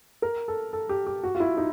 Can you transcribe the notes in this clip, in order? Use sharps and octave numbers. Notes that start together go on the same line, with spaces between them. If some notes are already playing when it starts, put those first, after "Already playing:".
A#4
A4
A4
G4
G4
F#4
F4
E4
D#4